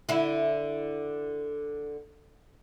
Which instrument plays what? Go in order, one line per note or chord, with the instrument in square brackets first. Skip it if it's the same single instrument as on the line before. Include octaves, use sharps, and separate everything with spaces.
[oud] D3 E4